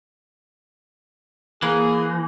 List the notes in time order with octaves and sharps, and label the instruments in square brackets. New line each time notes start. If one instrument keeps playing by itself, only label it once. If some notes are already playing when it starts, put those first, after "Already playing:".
[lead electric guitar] E3 [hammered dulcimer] A#3 [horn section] G#4